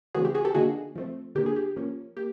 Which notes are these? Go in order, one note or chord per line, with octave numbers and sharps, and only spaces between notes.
C#3 E3 A3 C4 F#4 G#4
G4
F#4 G#4
G4 A4
D3 F3 A#3 D#4 F#4 G#4
F3 A3 C4
D3 F3 A#3 G4
G#4
G4
F3 A#3 C#4
A#3 G4